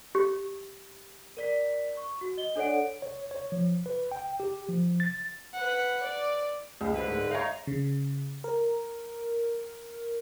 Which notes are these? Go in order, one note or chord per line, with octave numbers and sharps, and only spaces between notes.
G4
A#4 D5 B6
C#6
F#4
D#5 G7
D4 A4 C#5 D5 F#5 D7
C#5
C#5
F3
B4
G5
G4
F3
A6
B4 F#5
D5
C#2
C2 D3 B4
G#2
D#4 C#5 F5
C#3
A#4